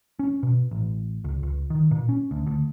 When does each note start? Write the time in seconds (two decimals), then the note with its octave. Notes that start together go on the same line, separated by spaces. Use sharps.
0.19 C#4
0.43 B2
0.71 A1
1.24 C#2
1.43 C#2
1.70 D#3
1.91 A#2
2.09 C#4
2.31 D2
2.47 D2